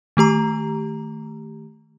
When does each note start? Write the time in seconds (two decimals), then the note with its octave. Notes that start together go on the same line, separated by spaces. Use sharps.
0.17 D#3 A3 G4 A#5